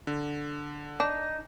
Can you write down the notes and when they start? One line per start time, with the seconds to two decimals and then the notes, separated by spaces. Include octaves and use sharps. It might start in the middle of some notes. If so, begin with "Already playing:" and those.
0.07 D3
1.00 D4 D#4